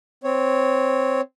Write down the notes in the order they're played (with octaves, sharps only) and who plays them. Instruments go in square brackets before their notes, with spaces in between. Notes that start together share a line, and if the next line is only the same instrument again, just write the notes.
[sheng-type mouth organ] C4 C#5